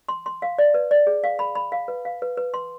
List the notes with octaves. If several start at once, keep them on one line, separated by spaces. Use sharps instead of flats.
C6
C6
F5
D5
B4
D5
G#4
F5
B5
B5
F5
B4
F5
B4
B4
C6